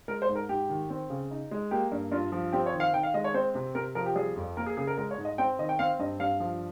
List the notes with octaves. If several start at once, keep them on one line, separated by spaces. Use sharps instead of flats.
G#3 A#4
C5
G#2
A#4
G#2 G4
D#3
C4
C#3
D#4
G#3
A#3 G4
G2
G2 F4
F3
C4 G4
C#5
D#3
F5
D#3 G5
F5
G#3 D#5
C#5
C4 C5
C3
C3 A#4
F3 A#4
G4
G3 G#4
F2
A#3 A#4
G#4
C#3 G#4
A#4
G#3 A#4
C#5
G#2
D#5
C4 G5
D#3 D#5
G5
C4 F5
G2 D#5
G2 F5
F3